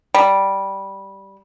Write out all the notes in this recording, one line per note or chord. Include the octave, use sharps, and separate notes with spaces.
G3